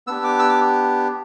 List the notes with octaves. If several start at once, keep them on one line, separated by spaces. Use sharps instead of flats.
B3 D4 G4 E6
D6
E6
D6